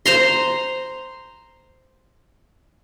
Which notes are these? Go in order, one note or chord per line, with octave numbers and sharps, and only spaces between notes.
C5 A#5 C6